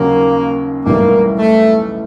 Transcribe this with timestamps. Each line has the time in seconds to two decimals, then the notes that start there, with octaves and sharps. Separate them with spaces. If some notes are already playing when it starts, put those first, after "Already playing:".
Already playing: D#2 C#3 F#3 A#3
0.85 B1 A2 E3 G3 A#3
1.38 A3